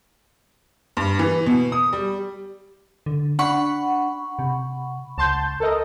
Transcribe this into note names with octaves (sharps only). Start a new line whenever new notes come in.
G2
E3
B2
D#6
G3
D3
D4 F#5 B5 C#6
C3
C#2 A5 C6 G6
A4 A#4 D#5